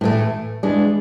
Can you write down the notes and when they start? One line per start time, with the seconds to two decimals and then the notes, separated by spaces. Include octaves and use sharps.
0.01 A2 E3 A3
0.63 E3 G#3 D4